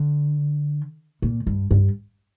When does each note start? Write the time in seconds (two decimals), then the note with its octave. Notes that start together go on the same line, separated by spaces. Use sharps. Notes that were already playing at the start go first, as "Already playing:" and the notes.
Already playing: D3
1.22 A#2
1.47 G2
1.71 G2